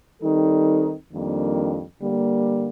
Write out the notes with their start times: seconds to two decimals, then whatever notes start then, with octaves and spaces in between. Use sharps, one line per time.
0.22 D#3 G3 C4 D#4 A4
1.10 F2 D#3 G3 A#3 D4
2.00 D3 G3 A#3